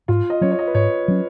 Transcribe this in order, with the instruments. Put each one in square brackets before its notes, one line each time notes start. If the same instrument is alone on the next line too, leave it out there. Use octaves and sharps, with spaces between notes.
[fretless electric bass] G#2 [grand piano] F4
[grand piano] D#5
[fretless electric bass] F#3 C#4 [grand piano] C#5
[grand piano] C#5
D#5
B4
[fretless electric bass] G#2 [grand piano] C#5
[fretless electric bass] F#3 C#4